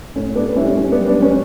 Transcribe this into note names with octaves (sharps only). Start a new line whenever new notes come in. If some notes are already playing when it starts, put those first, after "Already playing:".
A2 C#4
A2 B3 D4
D4
G3 C#4 E4
F#2 C#4
B3 D4
G3
B3 D4
F#2 C#4